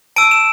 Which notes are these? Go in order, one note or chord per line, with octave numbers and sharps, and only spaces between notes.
A5 E6 D7
E7